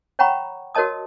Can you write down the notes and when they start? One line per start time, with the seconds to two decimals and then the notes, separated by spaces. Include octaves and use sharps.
0.19 C#5 F#5 G5 A#5 B5 C#6
0.75 F#4 A#4 C#5 D#5 A5 D#6